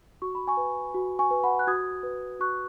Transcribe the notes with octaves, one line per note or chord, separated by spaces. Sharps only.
F#4 C#6
B5
G#5 C#6
B4
F#4
G#5 C#6
B4
F#5 B5
F#6
F#4 D#6 G#6
B4
F#4 C#6 F#6